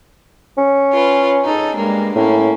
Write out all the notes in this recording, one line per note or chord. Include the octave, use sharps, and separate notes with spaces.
C#4
F4 B4
D#4 G#4 A4
G2 G#3 A#3
A2 A#3 C#4